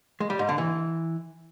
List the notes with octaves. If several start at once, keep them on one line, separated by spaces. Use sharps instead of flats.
G#3
G3
G#2
D3
E3